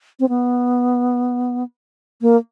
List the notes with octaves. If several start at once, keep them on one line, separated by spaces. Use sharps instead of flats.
C4
B3
A#3